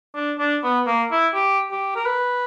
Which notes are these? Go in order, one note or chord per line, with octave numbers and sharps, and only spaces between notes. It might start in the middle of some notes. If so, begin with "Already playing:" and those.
D4
D4
B3
A#3
E4
G4
G4
A#4
B4